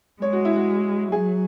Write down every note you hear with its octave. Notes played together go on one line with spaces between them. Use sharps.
G#3 C#5
F#4
E4
F#4
F#3 G#4